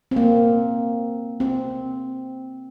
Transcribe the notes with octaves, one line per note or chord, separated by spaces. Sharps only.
C4
A#3
C4